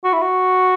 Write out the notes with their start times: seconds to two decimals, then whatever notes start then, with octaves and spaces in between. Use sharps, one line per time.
0.04 F#4
0.13 E4
0.22 F#4